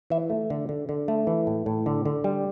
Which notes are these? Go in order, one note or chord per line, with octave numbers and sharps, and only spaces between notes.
E3 E5
A3
D3
D3
D3
A3
E3
A2
A2
D3
D3
G3